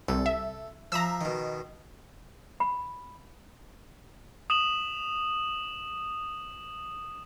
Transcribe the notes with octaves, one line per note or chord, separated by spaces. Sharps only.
C2 A4
E5
F3 E5 A#5 E6
B2 D#3
B5
D#6 E7 F#7